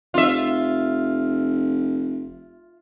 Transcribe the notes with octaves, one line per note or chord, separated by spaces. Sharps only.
F1 F4 E5